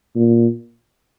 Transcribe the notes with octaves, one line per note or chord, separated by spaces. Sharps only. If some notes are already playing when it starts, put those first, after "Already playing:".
A#2